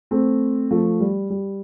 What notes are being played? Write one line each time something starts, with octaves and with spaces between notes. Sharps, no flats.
A3 C4
F3 A3
G3
G3